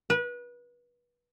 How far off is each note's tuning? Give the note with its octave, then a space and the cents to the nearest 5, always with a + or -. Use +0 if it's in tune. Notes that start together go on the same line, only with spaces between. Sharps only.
B4 -30